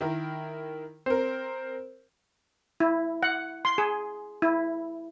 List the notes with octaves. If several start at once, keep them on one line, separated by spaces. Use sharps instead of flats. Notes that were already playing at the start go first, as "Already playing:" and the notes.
D#3 E4 A#4
C4 A#4 C5
E4
F#5
C6
G#4
E4